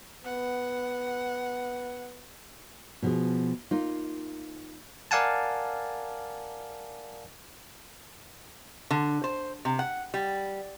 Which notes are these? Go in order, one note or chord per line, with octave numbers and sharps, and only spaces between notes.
B3 F#5
B2 F3 G#4
A#3 D#4 F4
A#4 D5 F5 F#5 G#5 A5
D3
C5
C3
F#5
G3